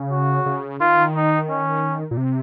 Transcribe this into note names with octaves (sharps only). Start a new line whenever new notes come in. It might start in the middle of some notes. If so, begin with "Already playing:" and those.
Already playing: C#3
F#4
C#3
D#3 F4
D#4
C#4
A#2
C3